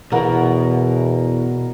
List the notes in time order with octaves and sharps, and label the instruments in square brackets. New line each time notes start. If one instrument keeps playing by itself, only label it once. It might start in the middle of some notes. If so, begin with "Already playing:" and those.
[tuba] E2 [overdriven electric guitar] B2 [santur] A#4 F#5